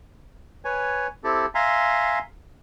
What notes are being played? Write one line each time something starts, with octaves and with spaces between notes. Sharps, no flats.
B4 C#5 G#5
C4 E4 G4 A4
E5 F5 G#5 A#5 C6